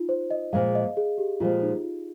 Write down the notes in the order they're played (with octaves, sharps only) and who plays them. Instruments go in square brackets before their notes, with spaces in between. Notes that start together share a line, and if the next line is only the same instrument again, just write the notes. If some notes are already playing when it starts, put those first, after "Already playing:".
Already playing: [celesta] D#4 F4
C5
D#5
[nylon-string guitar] A#2 F3 G#3 [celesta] F5
[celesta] D#5
G#4
G4
[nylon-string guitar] A#2 F3 G#3 [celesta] F4
[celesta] D#4
F4